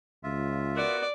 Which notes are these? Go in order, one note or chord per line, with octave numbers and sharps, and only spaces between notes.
C#2 F4 E5
B3 F#4 A#4 D5